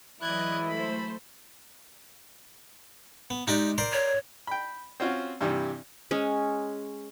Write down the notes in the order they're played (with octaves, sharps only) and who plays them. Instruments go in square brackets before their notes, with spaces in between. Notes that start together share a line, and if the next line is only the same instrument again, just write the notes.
[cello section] E3 F#3 G#3 [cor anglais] E4 [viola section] D5 D#5 [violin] F#6 G#6
[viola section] A3 C5 [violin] B5
[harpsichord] B3
[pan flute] G#3 [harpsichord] D#4 G4 D5
[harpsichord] A#4 C5 D5
[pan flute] C#5
[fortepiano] G5 B5
C4 C#4 F4 F#4
G2 C3 E3 G3
[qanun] G#3 C#4